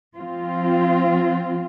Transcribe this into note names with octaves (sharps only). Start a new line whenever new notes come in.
F3 C4 F4